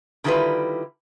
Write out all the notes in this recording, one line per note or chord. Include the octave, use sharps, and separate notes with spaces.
D3 D#3 G3 E4 F4 B4